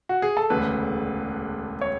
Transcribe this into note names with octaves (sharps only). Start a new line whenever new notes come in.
F#4
G#4
A4
E1 D2 C#3 B4
C#5